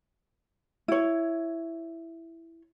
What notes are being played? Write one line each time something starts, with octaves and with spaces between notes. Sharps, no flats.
E4 C#5